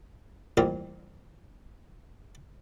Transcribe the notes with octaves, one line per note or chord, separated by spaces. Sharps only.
A1 F2 A#2 G3 C4 A#4